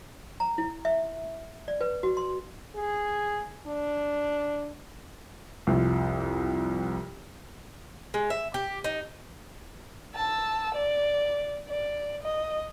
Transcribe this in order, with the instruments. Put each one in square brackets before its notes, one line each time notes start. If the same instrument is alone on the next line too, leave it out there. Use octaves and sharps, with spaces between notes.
[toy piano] A#5
E4
E5
D5
B4
F#4
C6
[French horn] G#4
D4
[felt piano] C2 F2
[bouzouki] G#3
E5
G4
D#4
[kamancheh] A5 E6
D5
D5
D#5